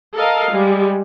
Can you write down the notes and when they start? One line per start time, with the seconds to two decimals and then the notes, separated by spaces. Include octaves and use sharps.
0.15 A4 A#4 D#5 F5
0.52 G3 G#3